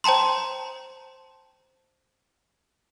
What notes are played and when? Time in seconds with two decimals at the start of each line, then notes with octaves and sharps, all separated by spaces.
0.04 C5 G5 A5 A#5 C6